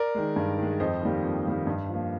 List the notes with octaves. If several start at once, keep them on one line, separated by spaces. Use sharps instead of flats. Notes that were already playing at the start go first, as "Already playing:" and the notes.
Already playing: A#4 D5
D#3 G#3
G2
D#3 G#3
F2 C5 D#5
D#3 G3 A#3
F2
D#3 G3 A#3
G2
F3 A#3